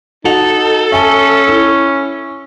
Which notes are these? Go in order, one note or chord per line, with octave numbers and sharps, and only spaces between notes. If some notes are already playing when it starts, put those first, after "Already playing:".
D#4 F#4 A4 F7
C#4 E5 G#5 A5
E4